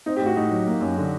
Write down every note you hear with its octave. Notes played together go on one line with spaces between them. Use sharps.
C4 D#4
G4
A2 F#4
A2 D#4
F#3
A#3
F#2
D3